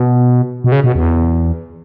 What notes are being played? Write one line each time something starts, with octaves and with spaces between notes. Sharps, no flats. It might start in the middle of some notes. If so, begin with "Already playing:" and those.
Already playing: B2
B2
C#3
B2
E2